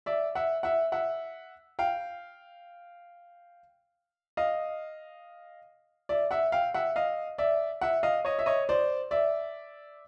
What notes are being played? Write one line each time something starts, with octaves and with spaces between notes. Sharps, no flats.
D5 E5
E5 F#5
E5 F#5
E5 F#5
F5 G5
D#5 F5
D5 E5
E5 F#5
F5 G5
E5 F#5
D#5 F5
D5 E5
E5 F#5
D#5 F5
C#5 D#5
E5
C#5 D#5
C5 D5
D5 E5